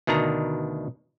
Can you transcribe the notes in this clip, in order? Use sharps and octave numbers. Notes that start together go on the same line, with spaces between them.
D2 B2 D#3 D4 A#5